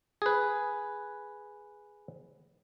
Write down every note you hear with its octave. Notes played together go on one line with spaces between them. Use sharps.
G#4 B4